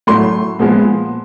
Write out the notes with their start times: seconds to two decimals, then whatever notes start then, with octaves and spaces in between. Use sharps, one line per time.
0.07 A2 F#3 A3 C6
0.59 A#2 F3 G#3 B3